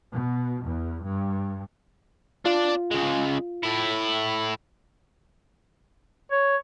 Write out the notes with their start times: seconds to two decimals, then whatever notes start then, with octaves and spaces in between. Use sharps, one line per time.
0.12 B2
0.64 E2
1.05 G2
2.46 D4 F4 D5
2.91 C#3 G#3
3.63 A2 E4
6.32 C#5